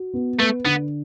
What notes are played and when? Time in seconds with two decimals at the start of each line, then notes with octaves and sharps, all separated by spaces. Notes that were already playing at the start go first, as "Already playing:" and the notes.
Already playing: F#4
0.14 B3
0.39 A3 B4
0.65 D3 B3